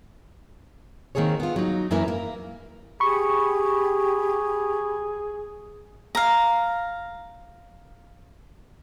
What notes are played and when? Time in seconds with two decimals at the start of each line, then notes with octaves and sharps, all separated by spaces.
1.15 D#3 A#3 C4 G#4 C#5
1.40 B3 F4
1.56 F#3 D#4
1.91 F#2 E3 A#3 E4 A#4 B4
2.08 A#3
3.00 G4 G#4 B5 C#6
6.15 F5 A#5